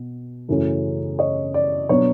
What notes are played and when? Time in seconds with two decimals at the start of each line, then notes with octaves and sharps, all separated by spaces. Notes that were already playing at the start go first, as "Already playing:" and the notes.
Already playing: B2
0.48 F#2 C#3 E3 A3 C#4
1.19 C#5 D#5
1.54 D5
1.89 B2 F#3 B3 D4 C#5